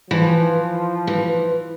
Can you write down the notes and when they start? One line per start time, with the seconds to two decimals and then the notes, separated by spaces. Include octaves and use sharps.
0.10 E3 F3
1.07 E3